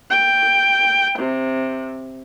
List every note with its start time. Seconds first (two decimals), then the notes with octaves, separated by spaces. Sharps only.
0.11 G5
1.19 C3